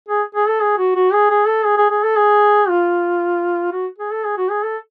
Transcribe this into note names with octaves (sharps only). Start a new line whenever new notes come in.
G#4
G#4
A4
G#4
F#4
F#4
G#4
G#4
A4
G#4
G#4
G#4
A4
G#4
F4
F#4
G#4
A4
G#4
F#4
G#4
A4